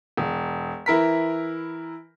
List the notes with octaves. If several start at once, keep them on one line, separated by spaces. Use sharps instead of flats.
E1
E3 E4 A#4 B6